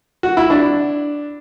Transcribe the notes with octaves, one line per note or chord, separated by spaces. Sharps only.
F#4
E4
D4